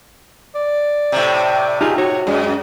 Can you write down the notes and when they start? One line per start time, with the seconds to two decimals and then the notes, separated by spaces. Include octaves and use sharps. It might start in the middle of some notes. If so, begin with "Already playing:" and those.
0.55 D5
1.12 A2 C3
1.81 D#4 F4 G4 G#4
1.98 F#4 C#5
2.27 F#2 G#3